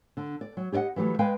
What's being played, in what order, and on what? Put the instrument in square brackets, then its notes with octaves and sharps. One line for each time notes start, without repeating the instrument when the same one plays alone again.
[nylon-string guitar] D3
D5
F#3
G4 G#4 D5 D#5 F#5
E3 F#3 G3 A3
G#3 B4 F5 G5 G#5